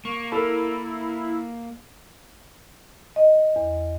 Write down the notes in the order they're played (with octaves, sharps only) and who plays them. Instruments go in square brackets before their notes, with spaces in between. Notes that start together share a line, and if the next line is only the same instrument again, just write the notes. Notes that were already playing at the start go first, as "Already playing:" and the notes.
[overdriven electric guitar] A#3 [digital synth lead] C#6
[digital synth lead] E4 [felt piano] A4 A#4
[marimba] D#5
E2